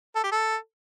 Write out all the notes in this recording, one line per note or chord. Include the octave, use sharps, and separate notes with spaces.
A4
G4
A4